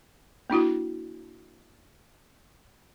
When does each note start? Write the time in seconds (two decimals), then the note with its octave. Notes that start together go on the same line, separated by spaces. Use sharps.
0.50 A#3 D4 E4 F#4